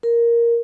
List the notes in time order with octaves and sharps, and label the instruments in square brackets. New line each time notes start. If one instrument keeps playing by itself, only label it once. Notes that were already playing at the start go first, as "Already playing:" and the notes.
[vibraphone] A#4